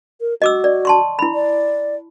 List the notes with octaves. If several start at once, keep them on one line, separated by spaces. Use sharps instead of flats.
A#4
F#4 D#5 D6 E6
D5
A5 C6 C#6
E4 B5
D5